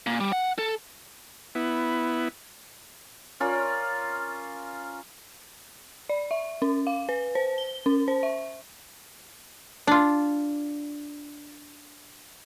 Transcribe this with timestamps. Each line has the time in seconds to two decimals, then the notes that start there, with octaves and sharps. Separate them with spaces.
0.07 A#2
0.20 G3
0.32 F#5
0.59 A4
1.55 B3 E4
3.40 C#4 F4 A#4 D5
6.09 D5
6.31 E5
6.62 C#4
6.87 F5
7.09 B4
7.35 C5
7.58 G7
7.86 C#4
8.08 C5
8.23 E5
9.87 D4 F4